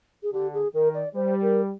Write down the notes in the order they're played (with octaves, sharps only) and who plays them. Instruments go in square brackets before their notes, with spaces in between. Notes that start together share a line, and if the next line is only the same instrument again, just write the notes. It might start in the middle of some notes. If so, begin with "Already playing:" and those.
[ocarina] G#4
[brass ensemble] D3 [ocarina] G4
[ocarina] G#4
[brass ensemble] D#3 [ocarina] A#4
[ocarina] D5
[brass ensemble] G3 [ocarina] C5
[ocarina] A#4